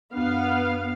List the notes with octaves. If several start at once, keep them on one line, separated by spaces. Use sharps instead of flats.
F#2 B3 D4 F5